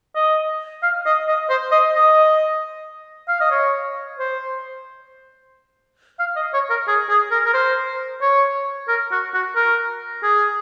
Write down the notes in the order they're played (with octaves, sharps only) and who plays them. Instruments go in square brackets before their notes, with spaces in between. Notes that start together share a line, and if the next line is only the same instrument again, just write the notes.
[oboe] D#5
F5
D#5
D#5
C5
D#5
D#5
F5
D#5
C#5
C5
F5
D#5
C#5
A#4
G#4
G#4
A#4
A#4
C5
C#5
A#4
F#4
F#4
A#4
G#4